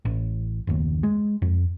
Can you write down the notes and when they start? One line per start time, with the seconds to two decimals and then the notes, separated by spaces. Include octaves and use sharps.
0.05 A1
0.67 F#1 D#2
1.03 G#3
1.42 F2